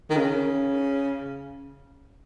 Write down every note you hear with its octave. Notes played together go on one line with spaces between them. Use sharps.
D#3
C#3